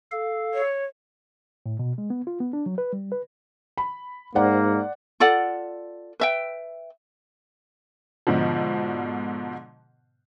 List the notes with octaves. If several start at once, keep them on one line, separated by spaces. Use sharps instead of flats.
A4 F5
C#5
A2
B2
G#3
B3
F4
B3
D4
F#3
B4
G3
B4
B5
G#2 A#3 C5 D5 F#5
F4 A4 D5 F#5
B4 E5 G5
G#2 B2 D3 F3